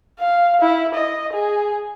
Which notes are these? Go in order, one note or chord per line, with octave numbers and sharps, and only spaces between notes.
F5
E4
D#5
G#4